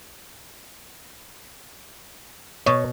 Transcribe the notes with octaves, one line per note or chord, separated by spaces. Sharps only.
B2 C#5